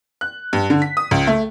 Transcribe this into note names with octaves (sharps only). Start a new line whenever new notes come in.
F#6
G2
D3
B6
D#6
C#2
A3